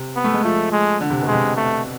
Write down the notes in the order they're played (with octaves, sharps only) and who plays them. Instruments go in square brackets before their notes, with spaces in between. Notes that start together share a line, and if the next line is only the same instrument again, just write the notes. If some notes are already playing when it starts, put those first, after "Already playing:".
Already playing: [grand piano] C3
[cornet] B3
[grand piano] A3
G#3
[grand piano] F3 [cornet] A3
[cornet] G#3
[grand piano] D3
C3
B2
[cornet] G#3
[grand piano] C3
[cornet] A3